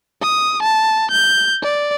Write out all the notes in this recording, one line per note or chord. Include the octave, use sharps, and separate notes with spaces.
D#6
A5
G6
D5